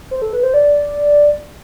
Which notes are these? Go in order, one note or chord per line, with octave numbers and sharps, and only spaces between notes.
C5
A4
B4
C5
D5